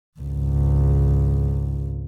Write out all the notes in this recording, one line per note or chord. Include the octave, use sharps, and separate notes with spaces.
G#1 C#2